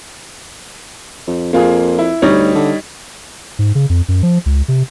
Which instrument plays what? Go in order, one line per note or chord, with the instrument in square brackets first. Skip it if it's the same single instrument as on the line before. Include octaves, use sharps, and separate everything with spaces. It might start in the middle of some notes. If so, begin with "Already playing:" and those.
[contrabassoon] F2
[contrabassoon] F2 [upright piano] A#3 F4 G#4
[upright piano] E4
[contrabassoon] D2 [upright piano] G3 D#4 C#5
[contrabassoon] D3
[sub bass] G#2
C#3
F2
F#2
F3
C#2
C3